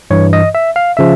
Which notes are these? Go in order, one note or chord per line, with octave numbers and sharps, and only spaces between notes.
G2 E3 C#5
D#5
E5
F5
C#3 F3 E5